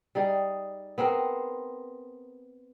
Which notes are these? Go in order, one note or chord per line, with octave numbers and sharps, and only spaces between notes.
G3 D#4 G#4
B3 C4 G#4 A#4